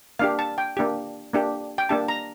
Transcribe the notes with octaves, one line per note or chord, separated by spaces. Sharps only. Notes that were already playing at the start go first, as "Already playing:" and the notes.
A#3 D4 G4 F5
A5
G5
A#3 D4 G4
A#3 D4 G4
G5
A#3 D4 G4 A5
A#5